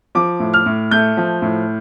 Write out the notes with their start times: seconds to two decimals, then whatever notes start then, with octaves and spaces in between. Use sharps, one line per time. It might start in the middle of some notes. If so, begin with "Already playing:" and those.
0.15 F3 D6
0.40 A2
0.54 F6
0.66 A2
0.91 A3 G6
1.17 F3
1.42 A2